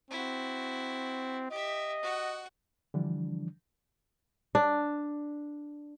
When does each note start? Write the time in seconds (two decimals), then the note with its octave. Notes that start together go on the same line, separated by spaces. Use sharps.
0.11 C4 E4 F#4
1.51 G4 D#5 E5
2.02 F#4 F#5
2.94 D3 E3 F3 G3 D4
4.55 D4